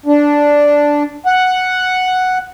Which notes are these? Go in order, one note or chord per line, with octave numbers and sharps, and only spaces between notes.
D4
F#5